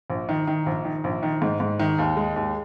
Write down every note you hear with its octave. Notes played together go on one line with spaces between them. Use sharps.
A#1
D#3
D#3
A#1
D#3
A#1
D#3
G#2
G#2
D#3
D#2
G#3
D#2